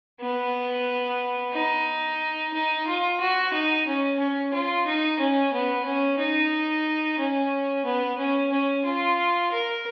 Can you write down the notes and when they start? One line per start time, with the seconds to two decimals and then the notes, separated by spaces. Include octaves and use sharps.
0.21 B3
1.53 D#4
2.53 D#4
2.87 F4
3.20 F#4
3.53 D#4
3.87 C#4
4.19 C#4
4.53 F4
4.87 D#4
5.19 C#4
5.53 B3
5.85 C#4
6.19 D#4
7.19 C#4
7.85 B3
8.18 C#4
8.52 C#4
8.85 F4
9.51 A#4